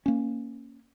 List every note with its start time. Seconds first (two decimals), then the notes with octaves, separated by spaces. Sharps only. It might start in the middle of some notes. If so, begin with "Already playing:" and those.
0.06 A#3 C#4